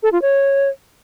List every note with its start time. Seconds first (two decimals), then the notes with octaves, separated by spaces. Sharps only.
0.03 A4
0.12 F4
0.22 C#5